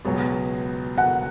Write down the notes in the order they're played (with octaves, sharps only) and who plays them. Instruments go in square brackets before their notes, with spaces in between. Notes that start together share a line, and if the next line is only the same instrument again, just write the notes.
[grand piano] C#2 B2 F#3 B3 G#4
[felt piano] F#5